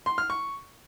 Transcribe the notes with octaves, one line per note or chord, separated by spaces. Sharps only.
C6
F6
C#6